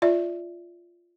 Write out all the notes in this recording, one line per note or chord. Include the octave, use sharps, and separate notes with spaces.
F4 D5 E5